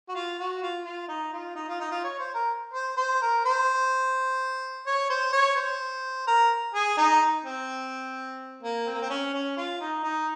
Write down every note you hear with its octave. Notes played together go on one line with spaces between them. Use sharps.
F#4
F4
F#4
F4
F4
D#4
F4
D#4
F4
D#4
F4
C#5
C5
A#4
C5
C5
A#4
C5
C#5
C5
C#5
C5
A#4
G#4
D#4
C4
A#3
C4
A#3
C4
C#4
C#4
F4
D#4
D#4